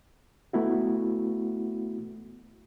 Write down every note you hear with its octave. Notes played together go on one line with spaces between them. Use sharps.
A3 B3 E4 F#4